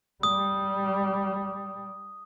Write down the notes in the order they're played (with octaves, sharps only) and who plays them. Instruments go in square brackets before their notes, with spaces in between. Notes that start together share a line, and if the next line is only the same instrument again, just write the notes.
[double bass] G3 [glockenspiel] D#6